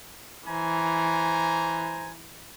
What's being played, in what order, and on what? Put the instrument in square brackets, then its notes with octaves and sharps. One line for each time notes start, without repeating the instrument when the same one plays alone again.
[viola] E3 [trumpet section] C5 G#5 A#5